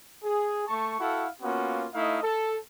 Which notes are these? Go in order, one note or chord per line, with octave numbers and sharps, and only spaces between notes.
G#4
A3 A5 C#6
E4 F#4 A4 F5 F#5
A#3 B3 C#4 F4 F#4
A3 D#4 E4 D#5 F5
A4